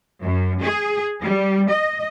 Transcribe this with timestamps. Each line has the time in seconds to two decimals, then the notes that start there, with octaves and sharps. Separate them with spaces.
0.23 F#2
0.62 G#4
1.23 G3
1.71 D#5